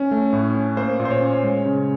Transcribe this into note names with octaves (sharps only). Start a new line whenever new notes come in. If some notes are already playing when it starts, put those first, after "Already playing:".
Already playing: C#4
A3
A2
C#4
A#3 C5
A#2
C5
C#5
C#4
G#3
C#3